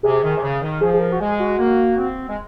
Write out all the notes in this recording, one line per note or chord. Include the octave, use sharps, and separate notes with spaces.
C3 G#4
D#3
C3
C#3
D#3
F3 G#4
G#4
A#4
F#4
G#3 G#4
F#4
A#3
C4
G#3